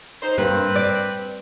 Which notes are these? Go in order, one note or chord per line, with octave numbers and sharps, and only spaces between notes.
D#4 C5
G2 A#3 C4 B4
D5